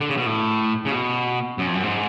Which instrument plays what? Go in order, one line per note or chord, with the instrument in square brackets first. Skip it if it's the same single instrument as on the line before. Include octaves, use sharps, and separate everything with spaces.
[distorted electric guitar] D3
C#3
B2
A2
C#3
B2
F#2
F2
F#2
G#2